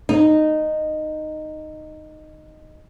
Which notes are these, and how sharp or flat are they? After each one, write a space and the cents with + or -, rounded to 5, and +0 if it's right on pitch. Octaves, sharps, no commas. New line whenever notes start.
D#4 -10